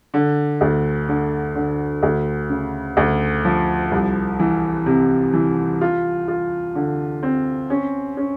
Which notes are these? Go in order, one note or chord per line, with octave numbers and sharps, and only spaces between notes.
D3
D2
D3
D3
D2
C#3
D2
F3
C2
E3
C3
E3
F4
F4
D3
C4
C#4
C#4